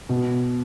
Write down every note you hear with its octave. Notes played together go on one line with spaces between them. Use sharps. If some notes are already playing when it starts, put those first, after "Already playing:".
B2